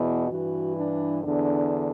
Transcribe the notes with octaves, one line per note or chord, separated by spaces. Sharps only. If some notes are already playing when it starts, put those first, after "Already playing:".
Already playing: E2 B2 E4
G2 E3 F#4
D4
E2 D3 D4